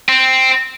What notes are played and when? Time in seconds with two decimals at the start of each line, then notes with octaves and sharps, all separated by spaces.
0.09 C4